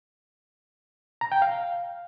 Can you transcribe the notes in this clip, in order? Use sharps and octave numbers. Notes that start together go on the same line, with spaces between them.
A#5
G5
F5